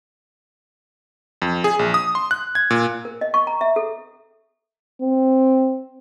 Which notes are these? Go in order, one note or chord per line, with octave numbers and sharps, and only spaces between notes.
F2
G#4
A#1
D#6
C6
F#6
G#6
A#2
A#4
D#5
C#6
A#5
E5
A4
C4